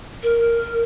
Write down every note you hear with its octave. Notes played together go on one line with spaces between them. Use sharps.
A#4